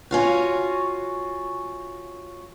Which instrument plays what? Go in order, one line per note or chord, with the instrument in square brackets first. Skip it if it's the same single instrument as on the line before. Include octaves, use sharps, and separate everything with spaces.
[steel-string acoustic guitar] C#4 F4 F#4